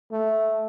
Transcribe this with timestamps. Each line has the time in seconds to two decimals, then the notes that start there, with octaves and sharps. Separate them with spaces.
0.12 A3